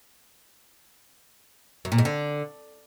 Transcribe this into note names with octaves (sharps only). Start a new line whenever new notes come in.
F#2
A#2
G#2
D3